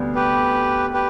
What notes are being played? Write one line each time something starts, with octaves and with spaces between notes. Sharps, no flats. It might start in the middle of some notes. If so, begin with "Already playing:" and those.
Already playing: D2 C3 G3 B3 D4
G4 B4
G4 B4